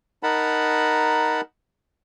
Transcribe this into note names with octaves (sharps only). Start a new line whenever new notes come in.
D#4 A#4 F#5 A5 B5